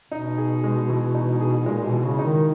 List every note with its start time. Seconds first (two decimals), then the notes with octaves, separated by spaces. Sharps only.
0.11 B2 D#4
0.38 G#4
0.64 G#3
0.90 E3
1.14 D#4
1.41 G#4
1.66 A#2 G#3
1.86 B2
1.92 E3
2.05 C#3
2.19 D#4
2.24 D#3